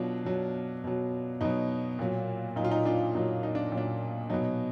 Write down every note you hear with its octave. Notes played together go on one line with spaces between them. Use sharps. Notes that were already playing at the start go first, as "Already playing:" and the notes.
Already playing: B2 F#3 D4 F4
B2 F#3
B2 F#3
B2 F#3 D#4
A#2 F#3
A#2 F#3 D#4
F4
D#4
D4 F4
A#2 F#3 D#4
D#4
D4
A#2 F#3
D4
B2 F#3 D#4